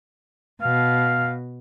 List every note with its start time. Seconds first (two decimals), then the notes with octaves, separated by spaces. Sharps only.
0.62 B2 F5